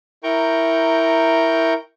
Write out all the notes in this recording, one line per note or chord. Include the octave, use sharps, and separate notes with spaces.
E4 A#4 G5 A#5 C#6 G6